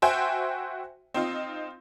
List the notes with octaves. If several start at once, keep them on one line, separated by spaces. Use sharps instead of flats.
F#4 C5 E5 G5 G#5
C4 D#4 F4